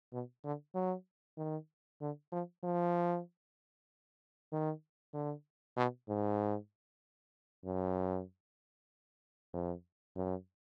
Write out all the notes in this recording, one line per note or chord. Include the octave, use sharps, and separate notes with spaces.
B2
D3
F#3
D#3
D3
F3
F3
D#3
D3
B2
G#2
F#2
F2
F#2